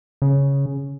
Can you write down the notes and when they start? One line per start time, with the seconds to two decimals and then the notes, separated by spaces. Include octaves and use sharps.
0.22 C#3